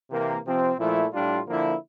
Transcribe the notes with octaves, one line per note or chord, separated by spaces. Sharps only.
C3 E3 A#3
C3 F3 C4
A#2 F3 A3 E4
A2 G3 D4 F4
D3 F3 A#3 E4